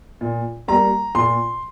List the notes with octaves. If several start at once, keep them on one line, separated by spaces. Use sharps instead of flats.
A#2
G3 A#3 A#5
A#2 C6